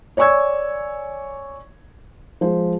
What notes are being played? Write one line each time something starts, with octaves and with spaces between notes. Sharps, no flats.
C#5 D5 G#5 C#6 E6 G#6
F3 G#3 C5